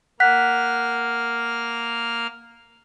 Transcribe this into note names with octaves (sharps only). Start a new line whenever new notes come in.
A#3 F#5 F6 F#6 B6